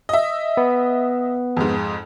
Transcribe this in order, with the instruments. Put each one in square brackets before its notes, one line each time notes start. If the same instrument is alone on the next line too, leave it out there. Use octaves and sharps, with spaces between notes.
[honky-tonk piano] D#5 E5
[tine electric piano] B3
[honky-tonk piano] F2 G#2